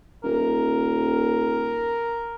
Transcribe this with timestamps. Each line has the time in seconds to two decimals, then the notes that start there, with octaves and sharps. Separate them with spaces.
0.24 D#1 A#4